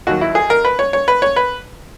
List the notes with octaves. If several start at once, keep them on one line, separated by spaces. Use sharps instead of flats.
D#2 D#3 F#3 F#4
E4
G#4
A#4
B4
C#5
C#5
B4
C#5
B4